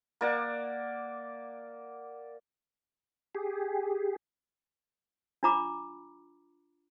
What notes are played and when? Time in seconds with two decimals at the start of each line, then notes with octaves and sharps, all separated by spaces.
0.21 A#3 D5 F#5
3.35 G4 G#4
5.43 D4 F4 A#5 B5 D6